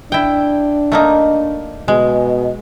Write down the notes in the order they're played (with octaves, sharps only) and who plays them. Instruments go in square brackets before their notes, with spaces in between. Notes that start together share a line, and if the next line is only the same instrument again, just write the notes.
[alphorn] D4 [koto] E4 G5
[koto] A3 A#3 D#4
[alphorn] B2 [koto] G#3